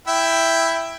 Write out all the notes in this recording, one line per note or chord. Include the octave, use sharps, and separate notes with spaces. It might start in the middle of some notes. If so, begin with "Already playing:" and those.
E4 E5 G5